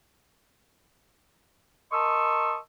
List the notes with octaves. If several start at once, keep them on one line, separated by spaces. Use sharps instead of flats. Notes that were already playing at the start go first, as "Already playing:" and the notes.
A#4 D#5 A5 C6 C#6 E6